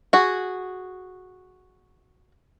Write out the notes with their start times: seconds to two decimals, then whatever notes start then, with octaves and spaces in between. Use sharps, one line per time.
0.13 F#4 G#4